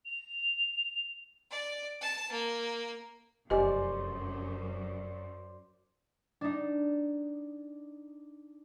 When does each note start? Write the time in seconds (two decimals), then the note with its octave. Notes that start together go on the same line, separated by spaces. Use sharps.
0.06 F7
1.51 D5
2.01 A5
2.32 A#3
3.50 F1 F#2 G4 C5 D5 D#5 G#5
6.41 D4 D#4